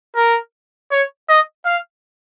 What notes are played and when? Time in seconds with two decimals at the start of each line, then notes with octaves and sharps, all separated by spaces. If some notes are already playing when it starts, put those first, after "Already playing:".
0.16 A#4
0.91 C#5
1.29 D#5
1.65 F5